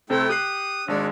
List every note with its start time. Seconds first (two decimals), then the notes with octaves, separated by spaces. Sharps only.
0.10 C3 A3 C4 E4 A4 G5
0.29 G4 D#6 F#6 C7
0.88 G#1 G#3 D4 C#5